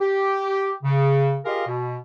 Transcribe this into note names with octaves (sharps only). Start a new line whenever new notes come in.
G4
C#3
F4 G4 G#4 A#4 D#5 F5
B2